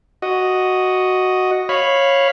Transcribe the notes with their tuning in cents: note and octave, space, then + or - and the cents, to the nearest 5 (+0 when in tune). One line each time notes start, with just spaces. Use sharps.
F#4 +0 D#5 +0
C#5 -10 F5 +0 B5 +0